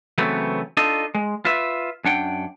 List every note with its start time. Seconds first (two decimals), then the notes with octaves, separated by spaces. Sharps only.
0.18 C#3 E3 F#3 A3 B3 C4
0.77 D4 D#4 F4 A4 D#5
1.15 G#3
1.45 F4 B4 E5
2.05 F#2 D4 F#5 G5